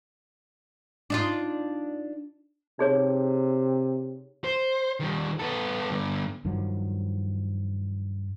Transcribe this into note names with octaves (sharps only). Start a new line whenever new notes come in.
D4 D#4 F4
C3 D#4 G#4 C#5
C5
D#3 G3
B3 A4
G2 D3
G2 D#3 F3 F#3